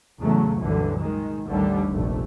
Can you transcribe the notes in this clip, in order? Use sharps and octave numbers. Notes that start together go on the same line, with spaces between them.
E2 A2 C#3 F#3 A3
C2 F#2 A#2 D3 E3
D#3 G#3
A1 D#2 D3 G3 A3
F1 A#1 A3